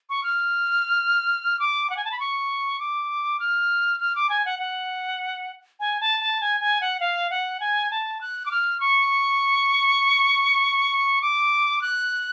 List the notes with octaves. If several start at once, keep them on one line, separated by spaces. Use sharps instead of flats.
C#6
F6
D6
F#5
G#5
A5
B5
C#6
D6
F6
F6
D6
G#5
F#5
F#5
G#5
A5
A5
G#5
G#5
F#5
F5
F#5
G#5
A5
F#6
D6
F6
C#6
D6
F#6